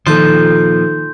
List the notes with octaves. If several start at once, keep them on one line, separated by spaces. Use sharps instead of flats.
A#2 D#3 F3 D#4 F4 A4 C6 G6